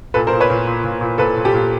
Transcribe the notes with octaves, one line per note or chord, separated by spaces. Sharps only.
A#2 A4 B4
A#4 C5
A#2
B4 C#5
A#2
A#2
A#2
A#2
A#2 A4 B4
A#2
G4 A4
A#2